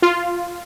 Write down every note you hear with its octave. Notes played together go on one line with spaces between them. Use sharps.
F4